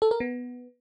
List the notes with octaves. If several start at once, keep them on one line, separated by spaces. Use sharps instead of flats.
A4
A#4
B3